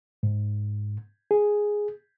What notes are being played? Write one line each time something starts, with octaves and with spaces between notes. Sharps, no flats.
G#2
G#4